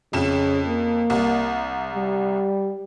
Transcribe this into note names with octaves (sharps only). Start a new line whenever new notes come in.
F2 C#3 E7
A#3
C2
G3